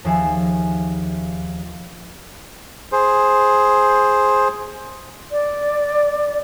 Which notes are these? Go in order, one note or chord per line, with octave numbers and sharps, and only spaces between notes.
D#2 D#3 F3 G#4 E5 C7
G#4 C5
D5